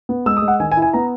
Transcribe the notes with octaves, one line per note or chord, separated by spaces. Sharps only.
B3
G#3 E6
D#6
G#3
F#5
D#3 G#5
G#5
E4
G#5
B3 A#5